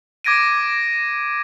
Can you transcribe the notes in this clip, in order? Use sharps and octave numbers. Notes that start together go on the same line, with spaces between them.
D6 G#6 A#6 D7 D#7